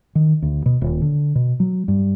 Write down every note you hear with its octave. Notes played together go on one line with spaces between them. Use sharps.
D#3
D2
B2
D#1
D3
B2
F#3
G2